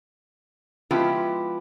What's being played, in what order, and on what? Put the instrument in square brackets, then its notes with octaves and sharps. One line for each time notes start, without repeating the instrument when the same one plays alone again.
[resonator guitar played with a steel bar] F3 G#3 B3 E4 F4 G4